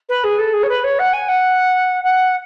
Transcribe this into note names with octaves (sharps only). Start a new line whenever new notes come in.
B4
G#4
A4
G#4
C#5
B4
C#5
F#5
G#5
F#5
F#5